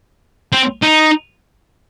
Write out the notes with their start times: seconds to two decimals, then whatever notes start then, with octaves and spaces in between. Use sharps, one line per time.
0.53 C4
0.83 D#4